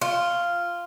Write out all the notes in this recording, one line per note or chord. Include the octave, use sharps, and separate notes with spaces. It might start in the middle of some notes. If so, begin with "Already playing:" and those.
F4